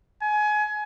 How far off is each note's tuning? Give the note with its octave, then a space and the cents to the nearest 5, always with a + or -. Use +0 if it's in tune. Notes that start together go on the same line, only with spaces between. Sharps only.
G#5 +25